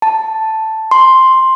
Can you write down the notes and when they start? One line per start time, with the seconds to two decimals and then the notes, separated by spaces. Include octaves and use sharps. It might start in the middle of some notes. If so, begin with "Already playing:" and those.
0.02 A5
0.91 C6